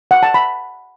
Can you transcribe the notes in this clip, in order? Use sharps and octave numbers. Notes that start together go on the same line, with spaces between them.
F#5
A5
B5